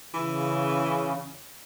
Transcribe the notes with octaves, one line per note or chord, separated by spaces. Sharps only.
C#3 E3